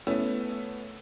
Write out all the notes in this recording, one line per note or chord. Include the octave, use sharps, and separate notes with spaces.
A3 B3 C#4 E4